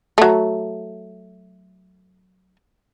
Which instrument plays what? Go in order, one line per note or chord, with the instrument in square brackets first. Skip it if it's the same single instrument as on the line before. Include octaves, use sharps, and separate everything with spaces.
[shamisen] F#3 A3